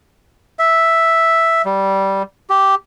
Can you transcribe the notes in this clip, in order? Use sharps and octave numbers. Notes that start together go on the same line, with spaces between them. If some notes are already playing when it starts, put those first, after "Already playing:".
E5
G3
G4